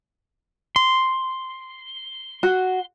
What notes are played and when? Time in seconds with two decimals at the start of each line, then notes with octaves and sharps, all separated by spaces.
0.76 C6
2.43 F#4